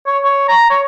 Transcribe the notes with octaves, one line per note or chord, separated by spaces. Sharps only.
C#5
C#5
A#5
C#5